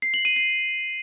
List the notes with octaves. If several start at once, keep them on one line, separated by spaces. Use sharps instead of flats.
C7
F#7
D#7
C7